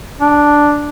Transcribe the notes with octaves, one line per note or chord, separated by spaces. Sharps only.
D4